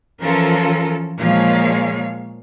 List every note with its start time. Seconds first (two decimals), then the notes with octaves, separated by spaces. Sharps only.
0.22 E3 F3 C#4 F4 A4 A#4
1.19 A#2 F3 G#3 G#4 C#5 F5